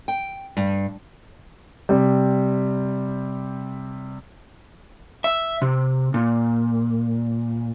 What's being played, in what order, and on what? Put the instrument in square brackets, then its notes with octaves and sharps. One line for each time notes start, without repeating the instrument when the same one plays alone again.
[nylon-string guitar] G5
G2
[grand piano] C3 G3
[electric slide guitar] E5
C3
A#2